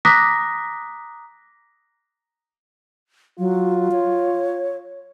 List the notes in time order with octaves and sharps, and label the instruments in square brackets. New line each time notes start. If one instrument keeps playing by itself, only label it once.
[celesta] A#5 D6 D#6 F#6 A#6 B6
[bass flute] F#3 [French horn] F4
[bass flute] C#5